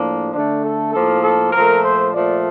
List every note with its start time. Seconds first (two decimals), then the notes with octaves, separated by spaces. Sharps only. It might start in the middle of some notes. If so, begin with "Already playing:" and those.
Already playing: A2 F3 A#3 D4
0.34 D3 A3 D4
0.63 A4
0.93 A2 F3 A#3 A4
1.23 A4
1.53 A#2 F3 A3 A#4
1.83 C5
2.13 A#2 F3 A3 D5